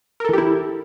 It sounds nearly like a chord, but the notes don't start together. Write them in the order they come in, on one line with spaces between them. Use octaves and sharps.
A#4 A4 E3 G4 E4